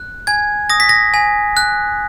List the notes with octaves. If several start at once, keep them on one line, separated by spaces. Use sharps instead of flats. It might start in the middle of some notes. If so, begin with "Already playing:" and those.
Already playing: F#6
G#5 G#6
D#6 A#6
B6
A#6
G#5
F#6